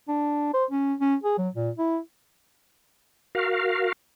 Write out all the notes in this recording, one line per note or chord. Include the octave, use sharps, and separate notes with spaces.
D4
C5
C#4
C#4
G#4
F#3
A#2
E4
F#4 A#4 F5